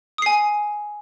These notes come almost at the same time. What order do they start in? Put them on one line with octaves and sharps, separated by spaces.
D#6 C7 G#5